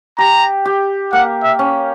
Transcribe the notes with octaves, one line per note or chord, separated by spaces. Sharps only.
G4 A#5
G4
A#3 F#5
E5
C#4